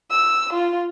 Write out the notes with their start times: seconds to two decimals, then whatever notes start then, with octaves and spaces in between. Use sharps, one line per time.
0.11 E6
0.53 F4